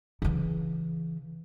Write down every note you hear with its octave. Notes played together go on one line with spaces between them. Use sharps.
C#3 E3